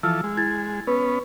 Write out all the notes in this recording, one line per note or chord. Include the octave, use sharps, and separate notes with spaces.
E3 F3 A4 E6 F6
G#3
E4 G#6 A6
B3 C#4 B4